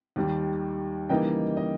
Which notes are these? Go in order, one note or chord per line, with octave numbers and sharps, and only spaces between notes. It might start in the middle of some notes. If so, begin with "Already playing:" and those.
D#2 D#3 G3
C#3 E3 G3 A#3 D#4 D#5 G5
D#5